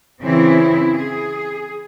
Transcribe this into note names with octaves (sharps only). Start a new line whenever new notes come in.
C#3 E3 C4 E4
G#4